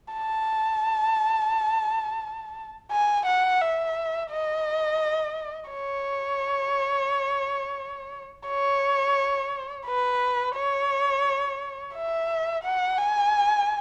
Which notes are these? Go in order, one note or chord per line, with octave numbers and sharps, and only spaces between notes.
A5
G#5
F#5
E5
D#5
C#5
C#5
B4
C#5
E5
F#5
G#5